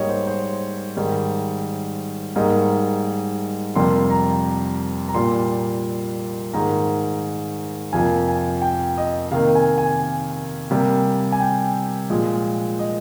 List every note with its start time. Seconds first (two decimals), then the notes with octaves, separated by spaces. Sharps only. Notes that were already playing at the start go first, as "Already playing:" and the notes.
Already playing: G#2 G3 A#3 C#5 D#5
0.09 C5
0.27 C5
0.97 G#2 D#3 G3
2.36 G#2 G3 A#3 D#5
3.76 F2 C3 G3 A#3 C6
4.10 A#5
5.08 A#5
5.15 A#2 G3 A#3 C6
6.53 G#2 D#3 A#3 A#5
7.93 F2 C3 F3 A#3 G#5
8.28 G#5
8.62 G5
8.98 D#5
9.31 C3 D#3 A#3 F5
9.55 G#5
9.78 G#5
10.71 C3 G3 A#3
11.32 G#5
11.40 G5
12.10 A#2 F3 G#3
12.79 D#5